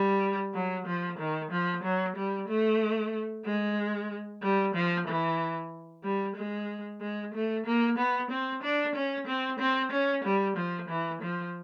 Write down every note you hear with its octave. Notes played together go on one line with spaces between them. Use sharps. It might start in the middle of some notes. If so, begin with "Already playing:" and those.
Already playing: G3
F#3
F3
D#3
F3
F#3
G3
A3
G#3
G3
F3
E3
G3
G#3
G#3
A3
A#3
B3
C4
D4
C#4
C4
C4
C#4
G3
F3
E3
F3